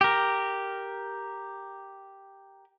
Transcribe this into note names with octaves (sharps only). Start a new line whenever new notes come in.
G4 A#4